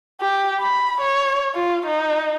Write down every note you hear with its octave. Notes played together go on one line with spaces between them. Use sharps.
G4
B5
C#5
F4
D#4